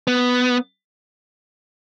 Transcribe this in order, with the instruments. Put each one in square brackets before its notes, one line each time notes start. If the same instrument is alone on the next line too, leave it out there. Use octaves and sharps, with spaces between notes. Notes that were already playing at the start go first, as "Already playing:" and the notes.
[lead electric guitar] B3